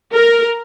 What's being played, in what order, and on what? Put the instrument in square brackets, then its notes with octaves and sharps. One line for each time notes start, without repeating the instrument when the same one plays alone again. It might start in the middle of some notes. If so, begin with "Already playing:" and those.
[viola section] A#4